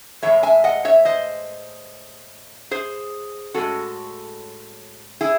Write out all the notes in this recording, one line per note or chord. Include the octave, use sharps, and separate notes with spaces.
A2 E3 G#3 C#5 E5
E5 G#5
D#5 F#5
C#5 E5
C5 D#5
G#4 C5
A2 G#3 C#4 F#4 A4
E4 G#4